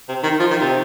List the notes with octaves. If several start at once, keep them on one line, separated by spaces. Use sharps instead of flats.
C3
D#3
F3
D#3
C3